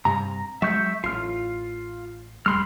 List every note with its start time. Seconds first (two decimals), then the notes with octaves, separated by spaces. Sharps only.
0.05 G2 C3 A#5
0.62 F#3 G#3 E5 C#6 G6
1.04 A1 F4 F6
2.46 E1 G3 B5 C6 F6